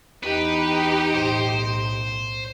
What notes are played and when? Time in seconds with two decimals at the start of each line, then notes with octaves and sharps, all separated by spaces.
0.23 E2 D#4 G4 B4 D#5
1.15 B1 A2 C5